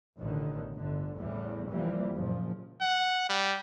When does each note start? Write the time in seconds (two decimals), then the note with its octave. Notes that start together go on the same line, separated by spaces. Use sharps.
0.18 A1 B2 D3 D#3
0.74 G1 D3
1.18 E2 A2 C#3 E3 G3
1.69 F1 E3 F3 G3 A#3
2.15 F#1 A#2 F3
2.81 F#5
3.29 G3